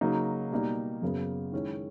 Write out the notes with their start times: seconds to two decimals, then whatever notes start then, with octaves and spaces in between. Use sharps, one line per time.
0.01 C#3 F#3 A#3 D#4
0.51 B2 G3 A#3 D#4
1.02 F#2 C#3 F#3 B3
1.52 D#3 G#3 C#4 E4